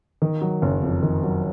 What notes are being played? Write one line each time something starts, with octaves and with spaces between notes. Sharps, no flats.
D#3
F#3
F#1
F2
D#3
F#3